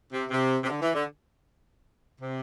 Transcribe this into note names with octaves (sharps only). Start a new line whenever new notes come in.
C3
C3
C3
D3
E3
D3
C3